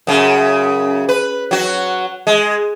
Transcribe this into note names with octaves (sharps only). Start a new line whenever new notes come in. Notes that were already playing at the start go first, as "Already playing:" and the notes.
F#2 C#3
B4
F#3 F#4
G#3